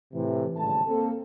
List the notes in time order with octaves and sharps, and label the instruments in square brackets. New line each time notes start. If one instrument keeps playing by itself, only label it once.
[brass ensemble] A2 C3 E3
G#1 C#3 G3 A3 A5
A#3 C4 A4